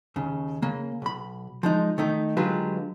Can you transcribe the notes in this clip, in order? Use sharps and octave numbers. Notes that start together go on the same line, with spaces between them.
D#2 C#3
C#3 A#3
B1 B5
F3 G#3 D#4
D#3 A3 D#4
D3 F#3 G#3 F4 G4 B4